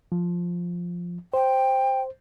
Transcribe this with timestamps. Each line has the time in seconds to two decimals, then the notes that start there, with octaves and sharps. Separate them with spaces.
0.12 F3
1.34 C5 G5